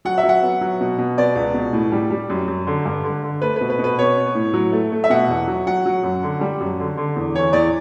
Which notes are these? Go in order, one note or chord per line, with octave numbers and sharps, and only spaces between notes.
F#3 F#5
E5
F#3
F#5
B3
F#3
B2
B2
B3 D5
C#2
B2
A2
G3
G3
F#2
F#2
D3
G2
D3
D3
A3 B4
B4
B2
B4
B2
B4
B3 C#5
B3
A2
F#3
A3
A3
E5
B2 F#5
E2
F#3
F#3 F#5
F#3
F#2
D3
G3
F#2
D3
D3
E2
E3 C#5
E2 D5